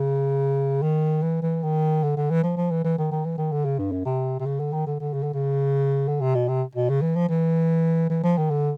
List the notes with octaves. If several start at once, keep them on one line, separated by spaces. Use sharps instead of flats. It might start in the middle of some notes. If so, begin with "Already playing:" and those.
Already playing: C#3
D#3
E3
E3
D#3
D3
D3
E3
F3
F3
E3
E3
D#3
D#3
E3
D#3
D3
C#3
G2
F#2
C3
C3
C#3
D3
D#3
D3
D3
C#3
D3
C#3
D3
C3
B2
C3
B2
C#3
E3
F3
E3
E3
F3
D#3
D3